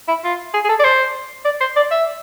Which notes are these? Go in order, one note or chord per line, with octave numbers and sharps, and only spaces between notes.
E4
F4
G#4
G#4
A4
D5
C5
D5
C5
D5
E5